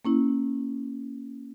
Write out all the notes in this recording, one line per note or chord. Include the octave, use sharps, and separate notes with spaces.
A#3 C#4 E4